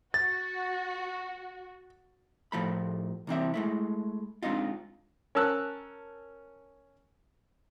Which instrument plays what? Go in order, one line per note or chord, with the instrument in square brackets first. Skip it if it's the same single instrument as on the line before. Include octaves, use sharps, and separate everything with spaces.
[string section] F#4 [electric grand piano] A6
[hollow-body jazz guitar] A2 F3 A3 B5
C2 E3 C4 E5
G#3 A3 E4
G#3 C4 D4 D#4 F4
[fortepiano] C#4 A#4 A5 E6 F#6